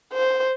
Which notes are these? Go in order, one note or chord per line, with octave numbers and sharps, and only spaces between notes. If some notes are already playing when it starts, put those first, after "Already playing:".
C5